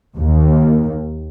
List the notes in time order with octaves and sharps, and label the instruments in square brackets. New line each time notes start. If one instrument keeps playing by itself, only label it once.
[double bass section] D#2